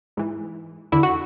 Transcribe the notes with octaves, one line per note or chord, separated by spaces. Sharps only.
G#2 E3
E2 D3 E4
F#4